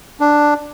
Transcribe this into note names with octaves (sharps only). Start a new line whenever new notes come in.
D4